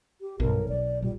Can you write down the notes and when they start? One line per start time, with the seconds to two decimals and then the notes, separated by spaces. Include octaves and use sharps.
0.21 G4
0.40 B1 G2 B2 A#4
0.69 C4 D5
1.02 A#2 G3